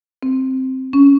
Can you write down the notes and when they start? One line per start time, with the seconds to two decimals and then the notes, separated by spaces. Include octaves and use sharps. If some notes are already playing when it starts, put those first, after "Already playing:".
0.23 C4
0.93 C#4